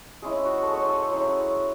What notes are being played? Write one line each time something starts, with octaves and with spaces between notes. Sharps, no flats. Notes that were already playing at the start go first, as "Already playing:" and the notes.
G#3 C#4 E4 G#4
F#4
G#4 A4
C#5
C5
A4
F#3 C#4 E4 G#4